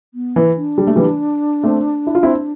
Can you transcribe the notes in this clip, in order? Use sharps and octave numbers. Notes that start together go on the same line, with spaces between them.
B3
E3
D4
G3
A3
E3 G3
A3 C4
E4
F4
C4 E4